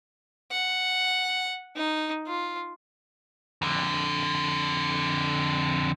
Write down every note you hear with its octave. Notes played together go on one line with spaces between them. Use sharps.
F#5
D#4
F4
F2 D3